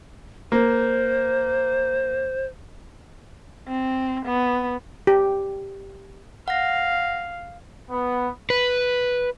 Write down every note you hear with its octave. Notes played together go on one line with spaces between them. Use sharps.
A#3 C5
C4
B3
G4
F5 F#5 A#6
B3
B4